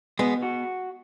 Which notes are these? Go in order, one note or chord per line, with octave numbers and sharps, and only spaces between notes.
B2 G#3 B3
F#4